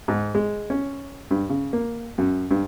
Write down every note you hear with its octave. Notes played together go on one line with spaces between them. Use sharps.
G#2
G#3
C#4
G2
C#3
A#3
F#2
G2